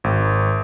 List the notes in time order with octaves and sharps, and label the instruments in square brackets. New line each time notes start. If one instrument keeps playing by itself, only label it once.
[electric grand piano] G#1